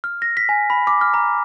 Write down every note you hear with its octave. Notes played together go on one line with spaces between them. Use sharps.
F6
A#6
B6
G#5
B5
D6
F6
A#5